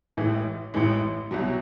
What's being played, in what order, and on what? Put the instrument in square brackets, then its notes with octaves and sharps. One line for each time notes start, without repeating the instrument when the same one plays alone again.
[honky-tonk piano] A1 A2 E3 G#3
A1 A2 E3 G#3
C2 B2 F#3